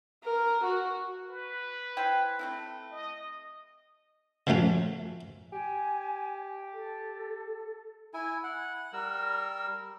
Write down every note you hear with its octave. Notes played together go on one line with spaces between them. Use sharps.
A#4
F#4
B4
E4 C5 G5
A3 C4 E4
D#5
C#3 F3 F#3 A3 C#4
G4 G#5
A4
E4 G#5
F#5
G3 A#4 E6